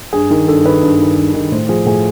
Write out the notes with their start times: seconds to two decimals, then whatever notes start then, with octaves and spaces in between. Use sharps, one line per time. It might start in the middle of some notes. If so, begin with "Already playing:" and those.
0.13 G2 G#4
0.30 D#3
0.48 G2 A4
0.65 D#3 B4
0.83 G2
0.99 D#3
1.18 G2
1.34 D#3
1.52 A2 C5
1.69 F3 G#4
1.86 A2 G#4